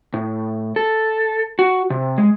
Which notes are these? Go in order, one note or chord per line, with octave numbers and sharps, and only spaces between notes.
A2
A4
F#4
C3
G#3